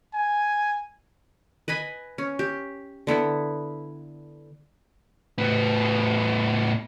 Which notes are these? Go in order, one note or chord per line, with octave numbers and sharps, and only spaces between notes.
G#5
B4 D#5 G#5 B5
C#4
G4
D3 B3 E4
A2 B3